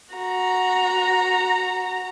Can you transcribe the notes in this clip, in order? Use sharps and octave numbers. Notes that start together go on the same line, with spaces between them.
F#4 A#5